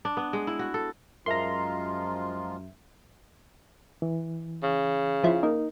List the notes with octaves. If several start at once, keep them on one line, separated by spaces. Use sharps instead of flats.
D4
B3
G#3
E4
F#4
A4
F#2 F3 G#3 F4 A#4 E5 A#5 C6
E3
C#3
F3 E4 F4
A#3 D#4 A#4